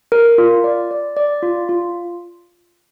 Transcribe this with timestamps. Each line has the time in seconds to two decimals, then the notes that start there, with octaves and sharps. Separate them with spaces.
0.12 A#4
0.38 F4
0.64 D5
0.91 D5
1.17 D5
1.43 F4
1.69 F4